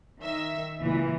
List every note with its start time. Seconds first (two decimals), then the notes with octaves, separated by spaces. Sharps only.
0.20 D#3 E5
0.80 C#2 A#2 E3